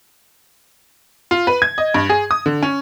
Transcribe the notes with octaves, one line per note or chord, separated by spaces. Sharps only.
F4
B4
G#6
D#5
G2
G#4
D#6
D3
C#4